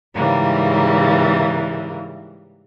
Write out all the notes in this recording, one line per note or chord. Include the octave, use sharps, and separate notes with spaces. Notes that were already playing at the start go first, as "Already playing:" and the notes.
G#2 C#3 E3 G3 A#3